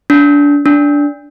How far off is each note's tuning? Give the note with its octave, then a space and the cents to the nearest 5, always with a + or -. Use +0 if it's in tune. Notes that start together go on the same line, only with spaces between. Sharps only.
D4 -25
D4 -15